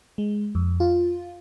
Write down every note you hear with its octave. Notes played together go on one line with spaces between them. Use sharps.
G#3
F2
F4